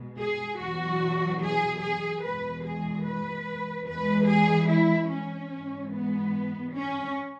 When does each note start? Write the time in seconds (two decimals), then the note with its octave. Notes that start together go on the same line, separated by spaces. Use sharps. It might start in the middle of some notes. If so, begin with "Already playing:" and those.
Already playing: B2 G#3
0.20 G#4
0.60 E2 B2 F#3 F#4
1.42 G#4
1.83 G#4
2.24 E2 B2 G#3 B4
2.65 G#4
3.06 B4
3.88 E2 E3 G#3 B4
4.28 G#4
4.70 E4
5.11 C#4
5.52 G#2 E3 G#3
5.92 B3
6.74 C#4